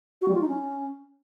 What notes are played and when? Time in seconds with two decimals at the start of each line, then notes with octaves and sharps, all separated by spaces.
0.21 F#4
0.28 G3
0.35 F4
0.41 D#4
0.48 C#4